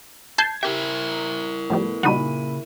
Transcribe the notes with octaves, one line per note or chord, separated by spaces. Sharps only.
A5 G6 G#6 C7
E4 G4 A#4 E5
A2 F3 G3 A3 B3
A#2 C#3 G3 D#4 F#4 B5 D#7